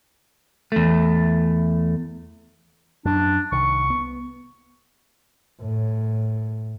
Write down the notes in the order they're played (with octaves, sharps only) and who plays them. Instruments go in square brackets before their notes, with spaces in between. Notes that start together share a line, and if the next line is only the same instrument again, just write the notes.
[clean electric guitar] E2 A3
[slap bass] F#2 [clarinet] D4
[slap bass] C2 D#3 [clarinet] C#6
[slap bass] B3
[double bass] A2